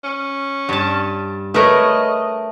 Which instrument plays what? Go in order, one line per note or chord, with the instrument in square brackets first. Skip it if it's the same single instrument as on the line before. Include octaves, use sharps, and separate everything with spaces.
[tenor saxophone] C#4
[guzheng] G2 A5
[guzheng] A3 A#4 C#5 [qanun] B4 [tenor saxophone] D#5